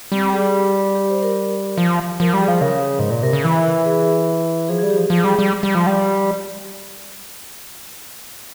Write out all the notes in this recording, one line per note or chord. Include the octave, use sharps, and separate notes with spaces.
G3 C4
G#4
G4
G4
C5
A#4
F3
F3 A#4
G3
G#4
F3
C#3 A#4
G#2
A#2
C3 A#4
C#3
E3
G#4
F3 G#4
G#4
G3
G4
F3
F3 G#4
G3
G3
G3
F3
G3